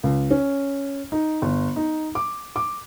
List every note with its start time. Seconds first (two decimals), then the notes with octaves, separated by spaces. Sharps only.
0.04 C#2
0.31 C#4
1.12 D#4
1.42 G1
1.76 D#4
2.15 D6
2.56 D6